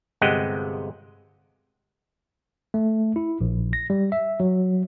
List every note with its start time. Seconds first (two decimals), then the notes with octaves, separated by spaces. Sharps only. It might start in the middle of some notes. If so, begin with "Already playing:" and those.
0.21 G1 C3 G#3 D#5 F#5 G5
2.74 A3
3.16 E4
3.41 A#1
3.73 A#6
3.90 G3
4.12 E5
4.40 F#3